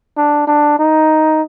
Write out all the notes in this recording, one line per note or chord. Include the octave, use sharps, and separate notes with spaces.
D4
D4
D#4